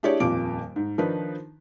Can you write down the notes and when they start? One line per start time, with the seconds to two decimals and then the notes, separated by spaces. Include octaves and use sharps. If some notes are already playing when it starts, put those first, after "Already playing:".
0.03 D4 E4 G4 G#4 C#5 D5
0.20 D#1 F2 F4 D6 D7
0.76 G#2
0.98 D#3 F3 D4 D#4 B4